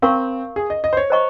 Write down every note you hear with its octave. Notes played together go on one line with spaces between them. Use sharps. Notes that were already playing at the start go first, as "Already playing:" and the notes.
C4 A#4 F5 A#5 C#6
G#4
D#5
D#5
C5
C#5
C5 D#5 A#5 C#6